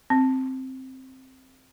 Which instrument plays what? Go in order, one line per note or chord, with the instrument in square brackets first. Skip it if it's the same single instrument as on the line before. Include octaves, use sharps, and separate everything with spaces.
[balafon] C4